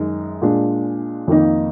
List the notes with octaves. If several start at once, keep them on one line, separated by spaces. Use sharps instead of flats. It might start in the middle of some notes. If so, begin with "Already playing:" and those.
Already playing: F#2 D#3 G#3 D#4
A#2 G#3 D4
F2 D#3 A#3 D#4